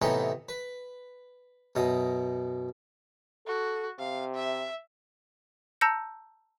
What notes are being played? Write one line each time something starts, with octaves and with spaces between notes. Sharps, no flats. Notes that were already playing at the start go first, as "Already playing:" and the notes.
A2 C3 E3 B3 D#4 C6
B4
F#2 B2 D#6
F#4 A4
C3 F5
E5
A5 A#5 E6 G6 A#6 C#7